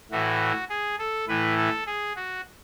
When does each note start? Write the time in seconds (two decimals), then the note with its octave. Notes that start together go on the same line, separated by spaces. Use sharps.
0.11 A2 E3 F#4
0.69 G#4
0.99 A4
1.28 A2 E3 B4
1.57 A4
1.87 G#4
2.16 F#4